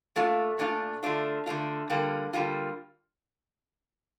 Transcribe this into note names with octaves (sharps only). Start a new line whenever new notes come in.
A#2 A3 D4 F4
A#2 A3 D4 F4
D3 A3 D4 F4
D3 A3 D4 F4
D3 G3 A#3 F4
D3 G3 A#3 F4